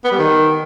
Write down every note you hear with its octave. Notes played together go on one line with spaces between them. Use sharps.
B3
G3
D#3